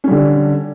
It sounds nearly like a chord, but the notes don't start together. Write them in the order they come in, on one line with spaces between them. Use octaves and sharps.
C#4 G3 D3